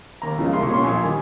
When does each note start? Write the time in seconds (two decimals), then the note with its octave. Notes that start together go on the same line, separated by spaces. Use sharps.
0.22 D#2 A#5
0.38 C#3 F3 G#3
0.53 C2 C6
0.63 C#6
0.69 A#2 G3 C#4 C6
0.84 A#1 G#5
1.01 D#3 G3